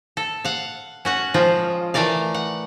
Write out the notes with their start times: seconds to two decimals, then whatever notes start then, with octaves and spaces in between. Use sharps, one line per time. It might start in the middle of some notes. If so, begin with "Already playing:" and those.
0.17 A4
0.45 F5 F#5
1.05 C#4 F#4 F#5
1.34 F3 G#3 F4
1.94 E3 A3 A#4 D5 F5
2.34 F#5